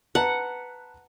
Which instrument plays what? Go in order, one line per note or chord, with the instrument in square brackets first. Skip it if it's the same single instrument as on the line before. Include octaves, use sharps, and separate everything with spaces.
[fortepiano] B4 A5 A#5 [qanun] F#5